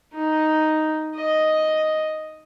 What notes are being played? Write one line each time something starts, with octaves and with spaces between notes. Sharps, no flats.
D#4
D#5